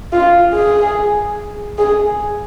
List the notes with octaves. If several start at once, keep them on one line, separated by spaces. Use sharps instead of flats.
F4
G#4
G#4